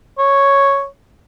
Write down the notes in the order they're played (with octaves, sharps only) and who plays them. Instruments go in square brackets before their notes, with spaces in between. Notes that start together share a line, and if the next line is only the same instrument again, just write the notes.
[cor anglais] C#5